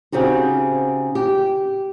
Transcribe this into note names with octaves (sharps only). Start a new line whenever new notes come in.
C#3 C4 D#4 F#4 G4
G4